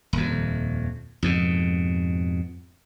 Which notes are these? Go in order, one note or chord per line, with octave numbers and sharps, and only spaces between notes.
D#1 F2
F2 G#2 B2